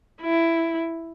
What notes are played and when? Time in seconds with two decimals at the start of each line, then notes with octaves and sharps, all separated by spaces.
0.22 E4